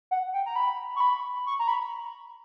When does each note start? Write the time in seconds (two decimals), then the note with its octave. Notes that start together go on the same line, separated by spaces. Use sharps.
0.11 F#5
0.34 G5
0.46 A#5
0.56 B5
0.96 C#6
1.00 B5
1.46 C#6
1.59 A#5
1.68 B5